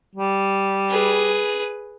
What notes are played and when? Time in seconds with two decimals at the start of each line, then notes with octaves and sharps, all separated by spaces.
0.15 G3
0.90 G#4 B4